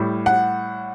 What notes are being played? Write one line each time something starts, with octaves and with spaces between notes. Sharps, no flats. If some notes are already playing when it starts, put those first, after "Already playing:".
Already playing: A2 G3
F#5